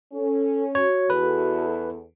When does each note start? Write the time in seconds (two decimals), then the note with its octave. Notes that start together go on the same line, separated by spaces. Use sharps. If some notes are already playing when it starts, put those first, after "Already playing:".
0.13 C#4 A4
0.75 F#4 C#5
1.10 E2 A4 B4